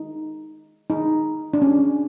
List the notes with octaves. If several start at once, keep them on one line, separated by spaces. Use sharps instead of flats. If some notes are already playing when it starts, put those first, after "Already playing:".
Already playing: D#4
D#4
D4
C#4